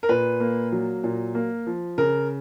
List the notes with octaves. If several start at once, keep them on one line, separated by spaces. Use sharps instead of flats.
A#4
A#2 B4
A#3
F#3
A#2
A#3
F3
C#3 A#4